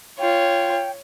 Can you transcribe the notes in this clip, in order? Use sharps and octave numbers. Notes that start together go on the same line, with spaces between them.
F4 C#5 G5